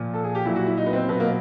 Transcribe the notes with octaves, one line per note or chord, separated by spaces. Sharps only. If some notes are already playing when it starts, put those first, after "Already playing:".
Already playing: A#2 F3
A4
G#4
G4
A#2 F#3 E4
F#4
E4
D#4
B3
C4
B2 F#3 B3
A#3